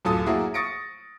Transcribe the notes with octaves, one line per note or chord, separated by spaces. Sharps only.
D1 F#2 F4 A4 D#6 A6
F#3 A#3 E4 F#4 G#4
C#6 D#6 A6 A#6 C#7 D7